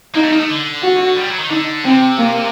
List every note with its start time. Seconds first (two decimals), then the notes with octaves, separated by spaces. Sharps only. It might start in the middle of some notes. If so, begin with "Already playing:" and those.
0.15 A#3 D#4
0.24 A3
0.32 A#3
0.40 A3
0.49 D3
0.82 F#4
1.16 G3
1.22 D#3
1.28 F#3
1.39 D#3
1.50 D3 D#4
1.84 C3 C4
2.17 A#3